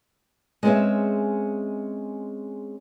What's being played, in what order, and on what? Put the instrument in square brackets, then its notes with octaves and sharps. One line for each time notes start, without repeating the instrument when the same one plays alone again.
[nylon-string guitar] G#3 C4 C#4 G#4 B4 E5